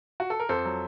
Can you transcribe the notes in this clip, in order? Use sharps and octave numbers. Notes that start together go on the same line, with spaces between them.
F#4
A4
A#4
F2 A4 C5
F#3